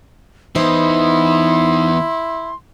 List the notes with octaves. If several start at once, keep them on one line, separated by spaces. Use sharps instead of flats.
E3 B3 D#4 E4 C5 C6